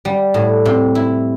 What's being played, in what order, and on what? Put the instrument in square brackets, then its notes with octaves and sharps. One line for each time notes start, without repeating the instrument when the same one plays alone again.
[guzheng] G3
A2
C3
E4